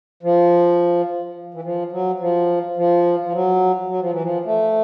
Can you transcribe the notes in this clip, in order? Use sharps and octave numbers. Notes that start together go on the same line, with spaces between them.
F3
E3
F3
F#3
F3
F3
F3
F#3
F#3
F3
E3
F3
A3